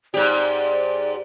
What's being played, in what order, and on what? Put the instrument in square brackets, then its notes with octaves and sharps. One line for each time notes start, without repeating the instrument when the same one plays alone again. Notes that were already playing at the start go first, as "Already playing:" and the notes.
[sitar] G#2 G4 [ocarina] D5